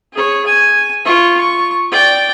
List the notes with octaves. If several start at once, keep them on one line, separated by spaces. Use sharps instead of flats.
G#4 C#5
G#5
F4 C#6
C#6
D5 G5